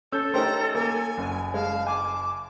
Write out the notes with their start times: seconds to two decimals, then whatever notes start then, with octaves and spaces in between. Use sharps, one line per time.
0.12 C#4 A4 E6 G6
0.34 A3 C#4 D#4 G4 A#4 C5 A#5
0.75 A#3 G#5
1.18 F#1 F#2
1.54 G#3 F5 A5
1.87 G#5 D6